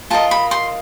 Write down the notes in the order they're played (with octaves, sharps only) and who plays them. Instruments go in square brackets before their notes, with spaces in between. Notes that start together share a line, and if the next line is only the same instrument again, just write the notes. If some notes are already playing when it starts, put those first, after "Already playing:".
[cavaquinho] F4 A#4 D#5 A5
B5
C6